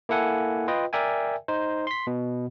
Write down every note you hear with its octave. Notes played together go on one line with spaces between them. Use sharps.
A#3 E4 A4 F#5 G#5
F4 B4 D#5 G5
A#4 D5 E5 G5 G#5
D#4 C5
C6 B6
B2